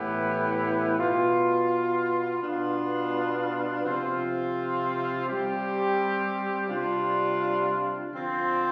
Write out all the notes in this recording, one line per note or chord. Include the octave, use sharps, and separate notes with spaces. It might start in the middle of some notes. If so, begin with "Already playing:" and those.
Already playing: A2 E3 B3 E4 G4
B2 B3 F4
B2 B3 D4 F4
C3 F3 C4 F4
G3 C4 G4
C3 G3 D4 F4
D3 F3 C4 F4